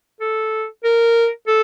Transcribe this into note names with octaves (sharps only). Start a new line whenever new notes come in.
A4
A#4
A4